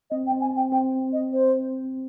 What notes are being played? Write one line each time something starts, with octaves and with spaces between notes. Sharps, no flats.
C4 D#5
G5
C4
G#5
C4
G5
C4 G5
D#5
C5